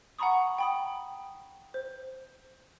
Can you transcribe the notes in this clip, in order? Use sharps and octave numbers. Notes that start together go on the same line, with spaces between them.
F#5 G#5 A#5 B5 C#6 D#6
G5 B5 D#6
C5